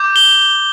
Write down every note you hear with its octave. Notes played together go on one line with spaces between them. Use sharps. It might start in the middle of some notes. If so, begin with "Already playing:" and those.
Already playing: D6 G6
G7